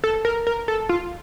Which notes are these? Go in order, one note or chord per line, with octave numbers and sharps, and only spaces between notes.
A4
A#4
A#4
A4
F4